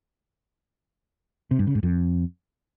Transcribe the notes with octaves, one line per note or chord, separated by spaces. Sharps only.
C3
G2
C#3
G#2
F2